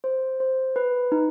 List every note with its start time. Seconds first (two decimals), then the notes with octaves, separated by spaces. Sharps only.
0.04 C5
0.40 C5
0.76 B4
1.12 D#4